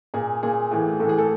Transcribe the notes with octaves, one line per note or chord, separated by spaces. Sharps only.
A#2 G#4
A#2 G#4
A2 E3
A2 E3 A4
G#4
A4